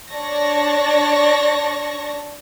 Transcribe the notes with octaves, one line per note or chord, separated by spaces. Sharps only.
D4 C#5 D5 A5 C#6 A#6